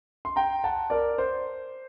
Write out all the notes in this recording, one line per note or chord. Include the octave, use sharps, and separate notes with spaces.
C6
G5 A#5
F#5 A5
A#4 D5
C5